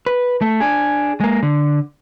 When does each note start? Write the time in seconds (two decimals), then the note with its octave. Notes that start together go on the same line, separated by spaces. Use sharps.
0.06 B4
0.41 A3
0.60 D4 G#4
1.20 G#3 A#3
1.43 D3